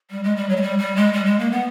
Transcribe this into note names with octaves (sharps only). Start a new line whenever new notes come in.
G3
G#3
G3
F#3
G#3
G3
G3
G#3
G3
G#3
A#3
B3